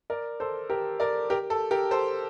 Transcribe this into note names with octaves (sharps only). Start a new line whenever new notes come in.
A#4 D5
A4 C5
G4 A#4
A#4 D5
G4 A#4
A4
G4 A#4
A4 C5